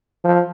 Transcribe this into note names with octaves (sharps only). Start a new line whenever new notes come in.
F3